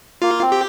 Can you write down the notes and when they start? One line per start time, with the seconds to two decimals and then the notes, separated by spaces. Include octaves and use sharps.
0.22 A#3 F4
0.42 C4
0.52 G4